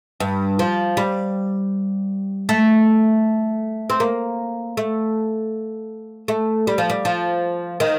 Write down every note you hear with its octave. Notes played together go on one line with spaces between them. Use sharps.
G2
F3
G3
A3
C4
A#3
A3
A3
G3
F3
G3
F3
D#3